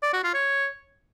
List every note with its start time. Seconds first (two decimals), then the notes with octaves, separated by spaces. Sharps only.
0.03 D5
0.13 F#4
0.24 F4
0.34 C#5